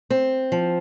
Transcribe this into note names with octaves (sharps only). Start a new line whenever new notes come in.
C4
F3